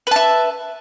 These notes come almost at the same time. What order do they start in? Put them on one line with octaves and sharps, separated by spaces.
B4 A5 E5